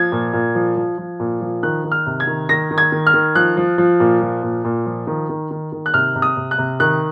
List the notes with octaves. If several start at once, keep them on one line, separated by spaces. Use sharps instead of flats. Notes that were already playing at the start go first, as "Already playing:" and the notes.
Already playing: F3 G#6
A#2
A#2
F3
F3
F3
A#2
F3
D#3 F#6
D#3
F6
C3
G#6
D#3
D#3 A#6
D#3
G#6
D#3
F6
D#3
F3 F#6
F3
F3
A#2
F3
A#2
A#2
F3
D#3
D#3
D#3
D#3
F#6
C3 F6
C3
D#6
C3
F#6
C3
D#3 F#6